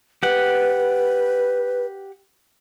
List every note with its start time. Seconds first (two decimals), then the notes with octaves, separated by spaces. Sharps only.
0.23 G4 B4 F#5